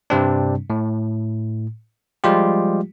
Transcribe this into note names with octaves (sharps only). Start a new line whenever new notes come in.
G2 C3 G3 C4 D4
A2
F3 G3 G#3 F4 G4